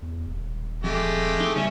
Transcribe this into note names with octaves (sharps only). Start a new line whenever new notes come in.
E2
D#1
F2 G#3 A3 G4
D#4
C#3 G3 B3 C#4 E5